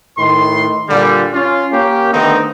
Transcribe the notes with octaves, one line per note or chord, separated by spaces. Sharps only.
A2 D#3 B4 C6
A#2 D3 G3
C#4 F4
A#3 C#4 G4
D3 D#3 A3 B3 C4 D#4